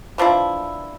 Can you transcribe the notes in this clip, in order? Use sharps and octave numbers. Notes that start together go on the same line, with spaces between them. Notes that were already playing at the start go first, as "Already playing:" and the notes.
E3 F3 D4 E4